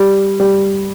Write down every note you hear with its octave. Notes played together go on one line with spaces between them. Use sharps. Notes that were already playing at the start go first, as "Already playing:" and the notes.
Already playing: G3
G3